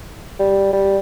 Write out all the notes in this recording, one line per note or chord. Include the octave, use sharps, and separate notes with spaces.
G3
G3